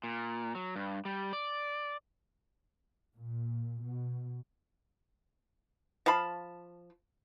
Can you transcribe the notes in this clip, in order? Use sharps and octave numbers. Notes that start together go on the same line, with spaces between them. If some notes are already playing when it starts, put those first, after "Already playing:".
A#2
F#3
G2
G3
D5
A#2
B2
F3 F5 A5 B5